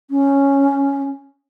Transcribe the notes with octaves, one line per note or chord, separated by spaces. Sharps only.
C#4